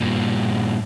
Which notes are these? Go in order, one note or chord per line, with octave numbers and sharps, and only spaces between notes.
G2 A#2